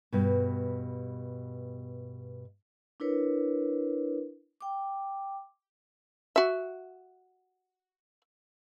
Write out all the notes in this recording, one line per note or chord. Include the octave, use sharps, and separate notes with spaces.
G2 B2
D4 E4 A#4 B4 C#5
G5 D6
F#4 E5